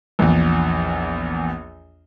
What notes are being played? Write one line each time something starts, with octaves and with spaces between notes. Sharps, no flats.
A#1 E2